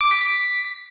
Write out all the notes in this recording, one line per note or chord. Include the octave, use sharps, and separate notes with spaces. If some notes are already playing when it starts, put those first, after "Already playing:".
D6
B6
B6